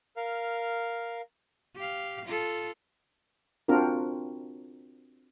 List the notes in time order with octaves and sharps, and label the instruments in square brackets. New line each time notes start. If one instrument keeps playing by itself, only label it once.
[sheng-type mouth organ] A#4 F5
[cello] G4 F5
F4 A4
[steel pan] C4 D4 F4 F#4 A#4